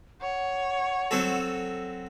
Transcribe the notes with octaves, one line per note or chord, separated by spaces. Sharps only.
C#5 F#5
F#3 C4 A4